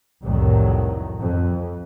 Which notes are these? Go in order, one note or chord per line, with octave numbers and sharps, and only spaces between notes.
C2 F2 A2 D#3 F#3
F2